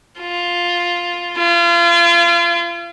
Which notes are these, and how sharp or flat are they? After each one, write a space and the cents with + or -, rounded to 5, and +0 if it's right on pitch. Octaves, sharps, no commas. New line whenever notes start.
F4 +5
F4 -35